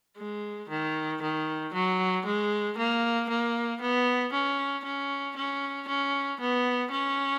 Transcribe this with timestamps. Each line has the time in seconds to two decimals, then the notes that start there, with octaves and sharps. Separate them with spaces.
0.18 G#3
0.69 D#3
1.22 D#3
1.73 F#3
2.26 G#3
2.77 A#3
3.29 A#3
3.81 B3
4.32 C#4
4.84 C#4
5.36 C#4
5.88 C#4
6.40 B3
6.91 C#4